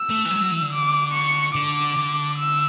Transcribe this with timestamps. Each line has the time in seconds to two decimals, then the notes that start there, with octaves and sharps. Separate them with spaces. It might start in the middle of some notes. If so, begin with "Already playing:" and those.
Already playing: E6
0.10 A3
0.26 E3
0.31 F#3
0.37 G#3
0.41 F#3
0.52 E3
0.62 D3
0.73 D6
1.14 C#6
1.55 D3 D6
1.97 D3
2.38 E6